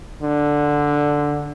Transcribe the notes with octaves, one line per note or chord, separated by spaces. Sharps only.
D3